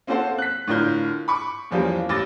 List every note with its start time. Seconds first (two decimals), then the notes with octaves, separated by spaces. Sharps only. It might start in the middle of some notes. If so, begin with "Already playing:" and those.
0.07 A#3 C4 C#4 A4 C5 F#5
0.38 F#6 B6
0.67 A2 D3 F4 A#4 G6
1.28 B5 C#6 D6
1.71 E2 E3 F3 G3 A#3 C#4
2.09 A1 D6 A6 A#6